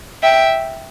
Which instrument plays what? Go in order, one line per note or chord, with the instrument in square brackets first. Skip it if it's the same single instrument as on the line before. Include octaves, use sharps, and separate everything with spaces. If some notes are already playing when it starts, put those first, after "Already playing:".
[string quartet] E5 G5